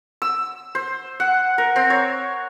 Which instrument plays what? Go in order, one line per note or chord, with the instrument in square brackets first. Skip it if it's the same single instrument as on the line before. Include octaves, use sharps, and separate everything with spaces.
[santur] E6
C5
F#5
A#4
C4
C#5